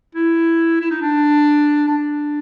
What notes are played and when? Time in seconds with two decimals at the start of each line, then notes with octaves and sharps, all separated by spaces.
0.15 E4
0.81 E4
0.91 D#4
1.02 D4
1.88 D4